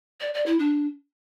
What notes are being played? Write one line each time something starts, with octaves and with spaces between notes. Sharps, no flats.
D5
D5
E4
D4